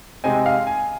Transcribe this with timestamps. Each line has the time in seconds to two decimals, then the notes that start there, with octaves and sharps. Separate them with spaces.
0.24 C3 G#3 C4 D#4 G#5
0.46 F5
0.67 G#5